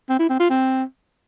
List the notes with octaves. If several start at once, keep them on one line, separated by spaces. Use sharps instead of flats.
C4
E4
C4
F4
C4